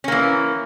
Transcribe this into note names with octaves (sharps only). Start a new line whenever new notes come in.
E3 A#3 C#4